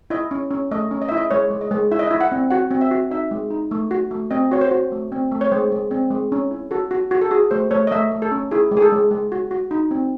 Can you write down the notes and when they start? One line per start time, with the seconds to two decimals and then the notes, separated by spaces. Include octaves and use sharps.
0.10 E4 D#5
0.31 C#4
0.51 C#4
0.71 A3 D#5
0.91 C#4
1.02 D#5
1.09 E5
1.12 E4
1.17 D#5
1.31 G#3 C#5
1.50 G#3
1.61 D#5
1.71 G#3
1.91 E4 E5
1.99 D#5
2.07 E4 E5
2.21 F#5
2.32 C4
2.51 F#4 F#5
2.71 C4
2.81 E5
2.91 F#4
3.11 D#4 E5
3.31 G#3
3.51 D#4
3.71 A3
3.91 F#4
4.11 A3
4.31 C4 D#5
4.51 F#4 C#5
4.61 C5
4.71 F#4
4.92 A3
5.12 C4
5.32 A3
5.41 C#5
5.51 G#3 C5
5.72 G#3
5.91 C4
6.11 G#3
6.32 C#4
6.51 E4
6.71 F#4 A4
6.91 F#4
7.11 F#4
7.21 A4
7.31 F#4 G#4
7.51 A3 C5
7.71 A3 C#5
7.87 D#5
7.92 A3 E5
8.11 A3
8.22 A4
8.32 C#4
8.51 E4 G#4
8.71 G#3
8.77 G#4
8.82 A4
8.92 G#3
9.11 G#3
9.32 F#4
9.51 F#4
9.71 D#4
9.91 C4